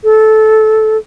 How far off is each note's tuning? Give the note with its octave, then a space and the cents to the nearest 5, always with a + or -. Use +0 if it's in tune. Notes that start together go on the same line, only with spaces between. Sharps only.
A4 -15